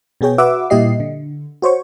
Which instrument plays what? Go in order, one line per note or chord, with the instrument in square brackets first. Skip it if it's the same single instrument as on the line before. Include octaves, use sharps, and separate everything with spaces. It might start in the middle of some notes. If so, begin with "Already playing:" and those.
[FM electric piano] B2 B3 G#4 C#5 G5
F#4 B4 E5 F#5 D6 E6
A#2 G3 E4 G4 D#5 C7
D3
F#4 C5 C#5 C#6